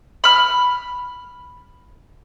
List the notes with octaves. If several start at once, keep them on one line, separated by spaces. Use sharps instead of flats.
B5 F6